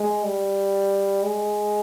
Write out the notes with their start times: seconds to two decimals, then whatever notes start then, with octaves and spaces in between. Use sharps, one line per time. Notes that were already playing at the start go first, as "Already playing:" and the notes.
Already playing: G#3
0.24 G3
1.23 G#3